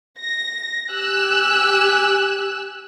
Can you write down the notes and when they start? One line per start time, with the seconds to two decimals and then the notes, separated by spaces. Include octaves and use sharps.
0.18 A#6
0.90 G4 G#5 E6 F#6